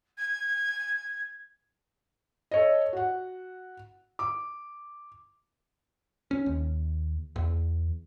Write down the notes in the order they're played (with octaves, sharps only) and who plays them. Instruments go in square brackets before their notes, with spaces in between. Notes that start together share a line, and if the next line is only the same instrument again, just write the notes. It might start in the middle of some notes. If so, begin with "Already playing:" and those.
[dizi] G#6
[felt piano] A4 C#5 D#5
F#4 F#5
D6
[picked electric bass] C#4
D#2
E2